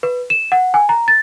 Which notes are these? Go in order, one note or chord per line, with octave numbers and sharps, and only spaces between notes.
B4
E7
F#5
G#5
A#5
A6